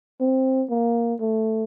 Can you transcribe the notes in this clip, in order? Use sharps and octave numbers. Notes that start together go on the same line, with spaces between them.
C4
A#3
A3